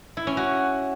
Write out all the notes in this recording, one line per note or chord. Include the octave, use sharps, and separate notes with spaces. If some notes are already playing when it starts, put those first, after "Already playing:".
E4
C#4
F#4